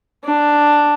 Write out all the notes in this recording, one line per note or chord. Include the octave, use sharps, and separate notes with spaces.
D4